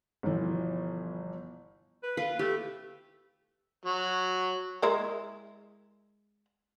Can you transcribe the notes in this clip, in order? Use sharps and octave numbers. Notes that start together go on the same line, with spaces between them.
G1 B2 E3 F3
B4
F4 B4
A3 G4
F#3
G#3 E4 A#4